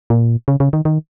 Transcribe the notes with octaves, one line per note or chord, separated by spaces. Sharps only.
A#2
C#3
C#3
D#3
D#3